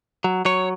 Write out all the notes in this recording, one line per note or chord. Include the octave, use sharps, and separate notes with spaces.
F#3
F#3 C#5